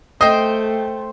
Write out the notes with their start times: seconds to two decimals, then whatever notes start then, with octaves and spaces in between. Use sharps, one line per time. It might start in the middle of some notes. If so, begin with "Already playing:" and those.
0.21 A3 C5 D#5 G5